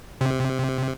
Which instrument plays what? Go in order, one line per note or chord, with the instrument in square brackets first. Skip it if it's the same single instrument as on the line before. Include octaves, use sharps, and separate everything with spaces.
[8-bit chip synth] C3